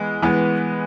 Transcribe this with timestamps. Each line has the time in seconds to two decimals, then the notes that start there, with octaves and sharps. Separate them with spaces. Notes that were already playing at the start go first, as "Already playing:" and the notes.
Already playing: E3 G#3 B3
0.22 E3 G#3 B3